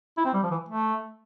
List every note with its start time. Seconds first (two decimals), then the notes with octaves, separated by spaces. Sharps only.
0.17 E4
0.25 C4
0.34 G3
0.43 F3
0.51 E3
0.69 A3